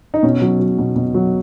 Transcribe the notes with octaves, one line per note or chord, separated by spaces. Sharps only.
D#4
B2 C#4
F#3
F#3
B2
B2
F#3